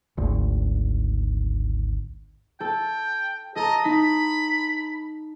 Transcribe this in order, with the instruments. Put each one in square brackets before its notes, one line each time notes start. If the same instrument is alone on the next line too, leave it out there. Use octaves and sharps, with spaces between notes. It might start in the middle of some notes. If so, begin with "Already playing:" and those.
[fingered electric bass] G#1 D2
[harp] A4 [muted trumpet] G5
[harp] A4 A#5 [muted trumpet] D#5
[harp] D#4 [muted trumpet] B5